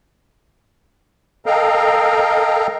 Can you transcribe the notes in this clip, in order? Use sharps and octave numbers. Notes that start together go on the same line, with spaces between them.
A4 A#4 D#5 F5 G5 A#5